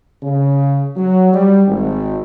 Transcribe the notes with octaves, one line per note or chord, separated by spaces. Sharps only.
C#3
F#3
G3
G#1